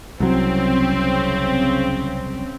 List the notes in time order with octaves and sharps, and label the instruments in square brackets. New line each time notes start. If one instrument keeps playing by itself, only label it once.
[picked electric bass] C2 F#3 [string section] C#3 C4